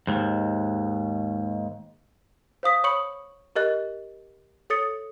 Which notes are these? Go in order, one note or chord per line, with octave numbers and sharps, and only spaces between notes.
D#2 G#2
C5 F5 D#6 B6
C#5 B5 C#6 D#6 C#7 F#7
G4 A#4 D#5 F#6
A4 C#5 D#6 A6 C#7